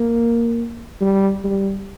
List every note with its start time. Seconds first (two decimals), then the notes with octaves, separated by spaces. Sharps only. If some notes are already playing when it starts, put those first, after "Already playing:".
Already playing: A#3
1.01 G3
1.44 G3